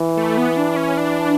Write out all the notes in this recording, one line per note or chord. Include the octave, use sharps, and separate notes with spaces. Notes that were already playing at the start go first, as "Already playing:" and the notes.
Already playing: E3
A3
B3
D4
C#4
D4